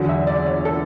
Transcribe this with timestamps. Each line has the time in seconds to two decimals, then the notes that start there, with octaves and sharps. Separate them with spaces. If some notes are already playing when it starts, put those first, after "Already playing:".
Already playing: E2 D3 F#3
0.09 E5
0.27 D5
0.46 C#5
0.65 A4